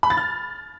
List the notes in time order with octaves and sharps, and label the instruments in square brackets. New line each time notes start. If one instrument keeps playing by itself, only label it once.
[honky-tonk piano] B5
A6
F6